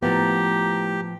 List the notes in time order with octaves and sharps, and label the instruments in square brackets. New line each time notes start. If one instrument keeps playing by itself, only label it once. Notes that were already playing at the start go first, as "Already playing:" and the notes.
[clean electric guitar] A2 [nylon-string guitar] F3 A#3 B3 [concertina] G4 [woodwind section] A#5